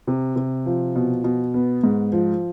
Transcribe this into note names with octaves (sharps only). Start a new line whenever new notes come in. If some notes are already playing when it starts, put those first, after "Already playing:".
C3
C3
F3
B2
B2
B3
G#2
F3